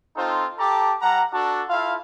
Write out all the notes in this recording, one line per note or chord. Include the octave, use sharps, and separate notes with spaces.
C4 D#4 F4 A4 C5
G4 A4 A5 A#5 D6
G3 F#5 A#5
D4 F#4 A4 D5 A5
E4 F4 A4 F5